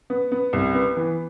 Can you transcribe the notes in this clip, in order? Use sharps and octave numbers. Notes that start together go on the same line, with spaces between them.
B3
B3
C2
B3
E3